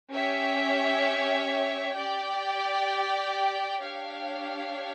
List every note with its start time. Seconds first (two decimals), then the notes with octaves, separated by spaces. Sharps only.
0.11 C#4 G4 C#5 E5
1.96 G4 D5 G5
3.81 D4 G4 C#5 F5